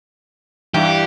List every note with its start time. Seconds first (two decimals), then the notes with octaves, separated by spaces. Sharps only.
0.74 G2 E3 G4